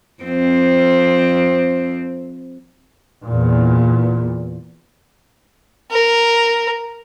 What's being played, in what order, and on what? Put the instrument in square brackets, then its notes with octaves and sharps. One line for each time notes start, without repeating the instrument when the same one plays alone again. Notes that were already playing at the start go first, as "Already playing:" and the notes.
[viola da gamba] F2 C4
[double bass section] E2 A#2
[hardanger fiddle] A#4